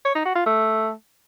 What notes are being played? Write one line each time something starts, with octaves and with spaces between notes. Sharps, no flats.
C#5
D#4
F#4
F4
A3